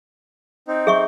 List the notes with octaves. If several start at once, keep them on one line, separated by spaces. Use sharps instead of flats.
C4 D#4
G#4 E5 C#6